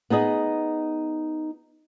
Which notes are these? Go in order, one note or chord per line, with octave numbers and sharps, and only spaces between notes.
B3 D#4 G#4 D#5